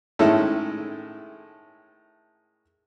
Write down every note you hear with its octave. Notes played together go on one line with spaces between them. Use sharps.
A2 D#3 G#3 C#4 E4 A4